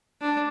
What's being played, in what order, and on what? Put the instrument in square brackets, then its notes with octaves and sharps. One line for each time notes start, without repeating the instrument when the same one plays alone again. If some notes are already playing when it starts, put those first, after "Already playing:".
[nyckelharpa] D4